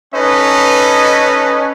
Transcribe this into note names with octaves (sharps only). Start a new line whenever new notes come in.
C#4 D#4 A4 B4 D#5